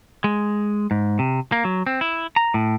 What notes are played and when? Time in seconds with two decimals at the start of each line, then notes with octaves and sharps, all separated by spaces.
0.24 G#3
0.91 G#2
1.19 C3
1.52 A#3
1.65 F#3
1.86 C4
2.01 E4
2.36 A#5
2.54 A2